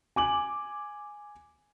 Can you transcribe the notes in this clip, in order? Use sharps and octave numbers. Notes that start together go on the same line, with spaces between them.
G#5 D6 F#7